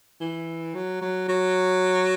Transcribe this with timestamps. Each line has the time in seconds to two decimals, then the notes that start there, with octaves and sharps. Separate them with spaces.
0.21 E3
0.75 F#3
1.02 F#3
1.28 F#3